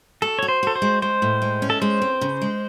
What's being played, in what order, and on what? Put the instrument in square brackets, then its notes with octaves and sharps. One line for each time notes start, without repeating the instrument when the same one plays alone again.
[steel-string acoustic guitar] F#4 [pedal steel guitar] A4
[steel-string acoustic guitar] F#4 [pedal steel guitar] C#5
[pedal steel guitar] C5
[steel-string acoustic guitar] F#4 [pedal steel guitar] A4
[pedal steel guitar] C5
[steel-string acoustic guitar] G#3
[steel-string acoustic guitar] G#3 [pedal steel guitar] C5
[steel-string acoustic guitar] A2
G#3
C#4
[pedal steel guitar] A4
[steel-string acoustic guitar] G#3 [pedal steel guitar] C5
[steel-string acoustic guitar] C4
C#3
G#3